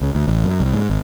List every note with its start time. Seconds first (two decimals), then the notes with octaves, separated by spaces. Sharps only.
0.01 C#2
0.15 D2
0.28 A1
0.44 F#2
0.60 C2
0.73 G#2
0.90 G#1